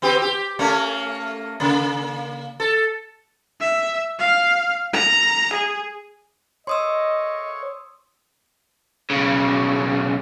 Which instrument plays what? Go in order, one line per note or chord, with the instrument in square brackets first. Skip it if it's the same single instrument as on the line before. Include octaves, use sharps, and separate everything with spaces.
[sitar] B3 C4 G4
G4
A3 A#3 C#4
C#3 A#3
A4
[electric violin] E5
F5
A#5
G#4
[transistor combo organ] C#5 [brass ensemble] D#5 [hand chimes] C6 D#6 E6
[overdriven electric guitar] B1 C#3